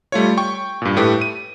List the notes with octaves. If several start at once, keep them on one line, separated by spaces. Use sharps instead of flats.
G3 A3 F4 C#5
G5 C#6
G2 A#2
A2 A3 G4 B4
D#7